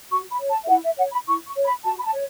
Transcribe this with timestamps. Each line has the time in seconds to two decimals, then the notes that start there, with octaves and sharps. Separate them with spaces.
0.11 F#4 C#6
0.31 B5
0.39 C#5
0.50 A5
0.64 E5
0.68 E4 F#5
0.83 E5
0.97 C#5 F#5
1.12 B5
1.26 E4 C#6
1.45 C#6
1.55 C#5
1.65 B5
1.84 F#4 A5
1.99 B5
2.03 A5
2.12 C#5